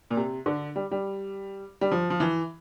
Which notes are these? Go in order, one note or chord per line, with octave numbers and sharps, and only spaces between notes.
A#2
C3
D3
G3
G3
G3
F3
F3
E3